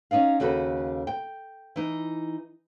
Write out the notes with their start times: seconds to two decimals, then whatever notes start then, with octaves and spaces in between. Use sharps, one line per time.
0.11 C#4 D#4 D5 F5
0.40 D#2 C#3 F#4 A4 B4
1.07 G5
1.76 E3 D#4